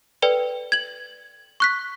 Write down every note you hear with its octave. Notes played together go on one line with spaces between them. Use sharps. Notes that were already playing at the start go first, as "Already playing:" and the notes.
A4 B4 D5 G5
G#6 F#7
C#6 F#6 B6